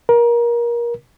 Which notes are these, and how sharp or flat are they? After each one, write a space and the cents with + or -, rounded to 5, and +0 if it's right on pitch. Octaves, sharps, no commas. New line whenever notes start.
A#4 +25